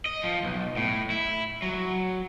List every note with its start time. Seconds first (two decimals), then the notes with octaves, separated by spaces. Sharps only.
0.06 D#5
0.23 F3
0.43 B1
0.77 A2
1.10 E4
1.62 F#3